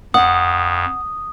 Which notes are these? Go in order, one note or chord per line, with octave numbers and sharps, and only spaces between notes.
F2 F#5 D#6